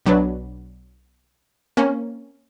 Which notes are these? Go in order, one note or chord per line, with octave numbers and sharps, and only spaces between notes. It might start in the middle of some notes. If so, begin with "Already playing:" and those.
B1 F#3 D4 B4
A#3 C4 C#4